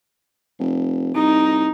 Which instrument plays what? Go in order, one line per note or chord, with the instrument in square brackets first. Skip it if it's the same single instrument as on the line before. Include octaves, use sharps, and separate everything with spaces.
[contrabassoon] F1
[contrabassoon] C2 [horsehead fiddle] D#4